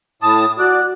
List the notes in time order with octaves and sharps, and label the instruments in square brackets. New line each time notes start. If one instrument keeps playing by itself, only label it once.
[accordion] A2 A5 [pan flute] D#6
[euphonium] F#4 [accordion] D5 [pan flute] F#6